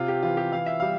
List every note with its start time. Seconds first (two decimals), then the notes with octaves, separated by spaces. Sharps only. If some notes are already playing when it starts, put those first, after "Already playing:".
Already playing: C3 F4
0.08 G4
0.23 E3 F4
0.37 G4
0.52 E3 F5
0.66 E5
0.80 G3 F5